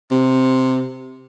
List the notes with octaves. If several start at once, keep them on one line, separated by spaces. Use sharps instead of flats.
C3